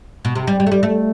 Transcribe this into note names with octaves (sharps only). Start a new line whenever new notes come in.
B2
C3
G3
G3
A3
G3
A3